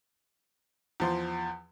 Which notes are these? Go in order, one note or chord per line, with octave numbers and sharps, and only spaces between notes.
E2 F3 C6